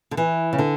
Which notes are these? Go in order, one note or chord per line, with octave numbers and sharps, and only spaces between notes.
D3
E3
C#3
D3